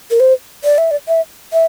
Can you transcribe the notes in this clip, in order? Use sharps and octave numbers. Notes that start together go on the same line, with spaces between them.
A#4
C5
D5
E5
D5
E5
E5